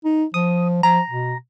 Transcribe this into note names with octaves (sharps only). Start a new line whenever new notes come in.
D#4
F3 D#6
F3 A#5
B2